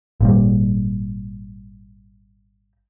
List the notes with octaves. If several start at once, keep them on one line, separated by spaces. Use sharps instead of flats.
G#1 A#2 G3